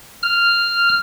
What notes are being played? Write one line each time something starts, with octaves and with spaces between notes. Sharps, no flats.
F6